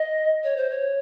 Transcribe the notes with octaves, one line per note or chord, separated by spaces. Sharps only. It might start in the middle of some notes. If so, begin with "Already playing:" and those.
Already playing: D#5
C#5
C5
C#5